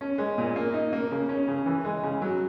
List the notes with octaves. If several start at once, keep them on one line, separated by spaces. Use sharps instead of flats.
C#4
G#3
A#2
A#3
D#4
A#3
C#3
C#4
C#3
E3
G#3
C#3
F#3